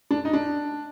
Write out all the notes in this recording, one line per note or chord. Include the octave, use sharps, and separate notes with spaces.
D4
D#4
D4